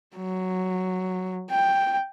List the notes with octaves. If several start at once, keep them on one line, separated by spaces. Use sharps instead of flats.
F#3
G5